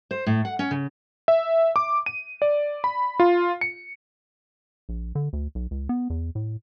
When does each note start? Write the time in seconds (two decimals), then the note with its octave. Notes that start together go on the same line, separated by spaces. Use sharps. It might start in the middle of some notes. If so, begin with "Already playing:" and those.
0.11 C5
0.26 A2
0.45 F#5
0.59 C#4
0.71 C#3
1.28 E5
1.76 D6
2.06 D#7
2.42 D5
2.84 B5
3.20 F4
3.61 C#7
4.89 A#1
5.15 D3
5.33 D2
5.55 B1
5.71 C#2
5.89 B3
6.10 E2
6.35 A2